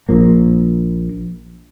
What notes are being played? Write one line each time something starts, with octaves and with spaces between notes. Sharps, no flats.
A#1 F3 A#3